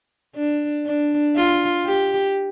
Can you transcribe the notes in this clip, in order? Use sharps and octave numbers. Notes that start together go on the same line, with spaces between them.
D4
D4
F4
G4